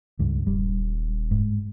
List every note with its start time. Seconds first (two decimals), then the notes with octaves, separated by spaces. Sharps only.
0.19 C#2 G2
0.47 D#1 G3
1.31 G#2